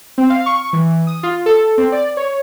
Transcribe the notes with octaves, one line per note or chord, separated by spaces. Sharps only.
C4
F5
C#6
E3
D#6
F4
A4
C4
D5
C#5